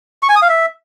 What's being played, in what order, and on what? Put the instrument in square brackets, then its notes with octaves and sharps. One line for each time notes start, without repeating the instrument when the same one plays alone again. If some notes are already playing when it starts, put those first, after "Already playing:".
[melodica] C#6
G#5
D#6
F5
E5